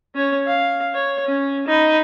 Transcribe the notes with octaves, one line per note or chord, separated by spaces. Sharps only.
C#4 C#5
F5
C#5
C#4
D#4 B5